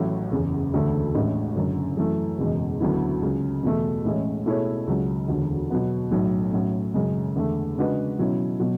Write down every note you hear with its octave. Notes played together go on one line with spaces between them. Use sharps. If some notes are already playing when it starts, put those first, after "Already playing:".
Already playing: A1 A2 F#3 A3
F#1 E2 C#3
E1 D2 D3 A3
A1 A2 G#3 D4
F#1 F#2 D3
F#2 E3 A3
F#1 E2 B2 G#3
D2 D3 F#3 B3 E4
C#2 C#3 F#3
E2 B2 A3
A1 A2 G#3 C#4
B2 A3 E4 G#4 C#5
C#2 C#3 F#3
E1 D2 D3
B2 F#3 B3
B1 A2 F#3
A2 F#3 C#4
F#2 C#3 G#3
E2 D3 A3
C#3 G#3 D4 F#4 B4
B2 F#3 C#4 E4
B2 F#3